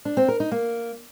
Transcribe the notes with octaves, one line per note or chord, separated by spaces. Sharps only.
D4
C4
A#4
D#4
A#3